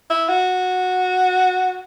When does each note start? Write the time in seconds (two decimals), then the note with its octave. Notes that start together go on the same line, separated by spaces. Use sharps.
0.10 E4
0.28 F#4